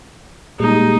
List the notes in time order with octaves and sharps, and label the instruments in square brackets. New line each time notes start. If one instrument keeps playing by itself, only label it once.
[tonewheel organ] A#2 G3 G#3 [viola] D#4